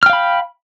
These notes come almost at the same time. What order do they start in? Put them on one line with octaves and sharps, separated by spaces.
F6 G5 F5 B5